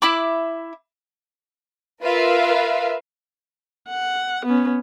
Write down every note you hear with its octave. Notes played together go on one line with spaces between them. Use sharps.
E4 E5 B5 D6
F4 A#4 B4 E5 F5
F#5
B3 C#4